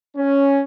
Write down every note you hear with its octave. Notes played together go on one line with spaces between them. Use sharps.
C#4